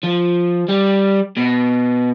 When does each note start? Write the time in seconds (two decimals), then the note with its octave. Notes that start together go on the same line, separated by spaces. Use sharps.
0.03 F3
0.69 G3
1.37 B2